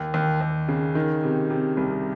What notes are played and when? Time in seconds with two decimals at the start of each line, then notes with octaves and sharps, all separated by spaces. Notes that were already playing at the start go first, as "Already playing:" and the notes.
Already playing: D#2
0.14 D#2
0.41 D#2
0.68 C#3
0.95 D#3
1.23 C3
1.50 C3
1.77 C2